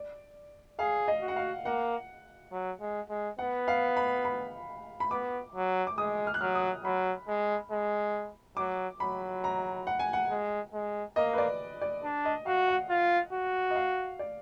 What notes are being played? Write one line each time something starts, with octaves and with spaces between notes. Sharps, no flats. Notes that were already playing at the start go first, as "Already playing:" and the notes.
Already playing: D5
G#4 F5
D#5
F#4
F#5
F5
A#3 F#5
F#3
G#3
G#3
B3 F#5
F5
B5
B5
B5
B3 D6
F#3
D6
G#3 D#6
F6
F#6
F#3 F6
D#6
F#3 B5
G#3
G#3
F#3 D6
F#3 B5
A#5
F#5
G#5
F#5
G#3
G#3
A#3 D#5
B4
D5
D5
D4
D#5
F#4 F5
F#5
F4
F#4
D#5
F5
D5